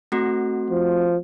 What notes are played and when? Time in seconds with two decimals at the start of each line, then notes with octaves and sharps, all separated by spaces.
0.12 A3 C4 F#4
0.70 F3